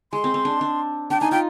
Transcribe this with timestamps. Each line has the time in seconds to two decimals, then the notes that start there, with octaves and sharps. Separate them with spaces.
0.12 G#3 C6
0.24 C4
0.34 C4
0.45 D4
0.61 D4
1.10 D4 G5
1.21 D#4 G#5
1.31 F4 G5